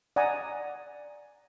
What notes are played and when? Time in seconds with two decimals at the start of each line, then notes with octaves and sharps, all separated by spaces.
0.16 D5 F#5 G#5 A#5 D#6